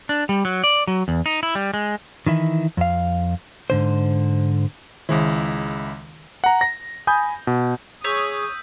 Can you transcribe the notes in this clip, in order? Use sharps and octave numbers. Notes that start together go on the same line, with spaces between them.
D4
G3
F#3
D5
F#3
E2
D#4
E4
G3
G#3
D#3 E3 E4
F2 F5
G#2 D3 C5
C#2 D#3 G#3 E4
F#5 A#5
A#6
G#5 B5 D#6 G6
B2
G#4 C#5 D#6 E6 G6 B6